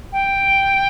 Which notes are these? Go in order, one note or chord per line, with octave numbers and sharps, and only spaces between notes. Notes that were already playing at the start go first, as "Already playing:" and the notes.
G5